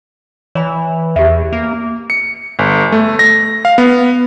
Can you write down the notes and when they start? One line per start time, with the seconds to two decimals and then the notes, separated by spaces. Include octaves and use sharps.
0.55 E3 C#5 B5
1.16 E2 G4 E5
1.53 A#3
2.10 C#7
2.59 G1
2.92 A3
3.19 A#6
3.65 F5
3.78 B3